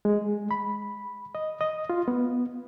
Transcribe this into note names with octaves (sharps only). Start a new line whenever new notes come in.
G#3
B5
D#5
D#5
F4
B3